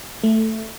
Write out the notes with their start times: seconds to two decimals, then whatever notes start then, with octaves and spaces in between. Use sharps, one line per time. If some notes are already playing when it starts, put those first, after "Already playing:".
0.23 A3